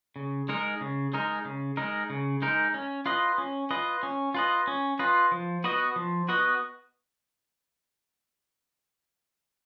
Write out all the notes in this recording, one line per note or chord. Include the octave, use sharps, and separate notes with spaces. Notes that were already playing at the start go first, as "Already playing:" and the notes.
C#3
G#3 D#4 A#4
C#3
G#3 D#4 A#4
C#3
G#3 D#4 A#4
C#3
G#3 D#4 A#4
C#4
F4 B4 D#5
C#4
F4 B4 D#5
C#4
F4 B4 D#5
C#4
F4 B4 D#5
F3
B3 F#4 B4 D#5
F3
B3 F#4 B4 D#5